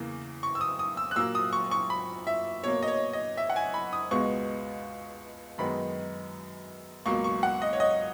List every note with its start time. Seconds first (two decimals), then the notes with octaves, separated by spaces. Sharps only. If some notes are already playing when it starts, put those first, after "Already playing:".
Already playing: E2 C#3 E3 A#3
0.43 C#6
0.55 E6
0.61 D#6
0.79 D#6
0.97 E6
1.11 F#6
1.16 A#2 F#3 A#3 E6
1.35 D#6
1.53 C#6
1.71 C#6
1.90 B5
2.27 E5
2.64 B2 A#3 C#5
2.83 D#5
2.88 C#5
3.13 D#5
3.37 E5
3.50 F#5
3.56 G#5
3.74 B5
3.93 D#6
4.11 C#2 B2 G#3 B3 C#6
5.58 F#2 D#3 G#3 B3 B5
7.06 C#2 B2 F#3 A#3 C#6
7.24 C#6
7.43 F#5
7.62 D#5
7.73 C#5
7.80 D#5